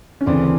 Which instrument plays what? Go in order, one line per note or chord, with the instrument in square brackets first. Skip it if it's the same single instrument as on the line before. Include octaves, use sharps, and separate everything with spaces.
[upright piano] C#4
[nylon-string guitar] D2 C#3 E3 [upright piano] C4 D4